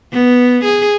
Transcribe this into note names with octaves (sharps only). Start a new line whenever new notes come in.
B3
G#4